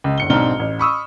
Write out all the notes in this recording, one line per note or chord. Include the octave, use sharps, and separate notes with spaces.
C#2
G1 C#7 G7
B1 G#2 C4 D4 F6 G7
A1
B5 C#6 D#6 E6